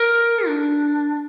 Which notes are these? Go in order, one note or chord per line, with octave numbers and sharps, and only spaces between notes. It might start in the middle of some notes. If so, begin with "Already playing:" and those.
Already playing: A#4
D4